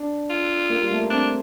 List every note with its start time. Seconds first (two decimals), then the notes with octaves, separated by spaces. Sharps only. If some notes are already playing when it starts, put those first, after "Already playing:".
Already playing: D4
0.30 F4
0.70 A#3
0.82 G3
0.91 A3
1.01 A#3
1.10 C4 D4